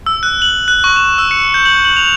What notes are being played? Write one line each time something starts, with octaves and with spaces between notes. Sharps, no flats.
E6
F#6
F#7
F#6
C#6
E7
E6
C#7
G6
F#7
F#7
F7